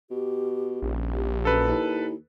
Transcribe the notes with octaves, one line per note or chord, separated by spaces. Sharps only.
B2 G4
D#1 A#1
G4
F#2 A4 B4
D#2 E4